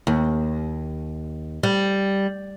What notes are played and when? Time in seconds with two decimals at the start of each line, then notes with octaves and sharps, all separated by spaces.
0.07 D#2
1.63 G3